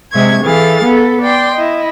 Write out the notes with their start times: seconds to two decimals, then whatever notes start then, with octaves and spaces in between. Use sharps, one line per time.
0.11 C3 G#3 E5 C#6 G#6
0.43 E3 G#4 A4 F5 A6
0.84 B3 A4
1.21 D5 G5 C6
1.54 E4 D#5